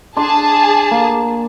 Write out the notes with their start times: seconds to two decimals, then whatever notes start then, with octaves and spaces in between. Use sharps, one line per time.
0.17 D4 G#4 A5 C6
0.91 A#3